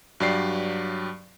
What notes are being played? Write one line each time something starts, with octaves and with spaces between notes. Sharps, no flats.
G2 F#3 G4 D5 C7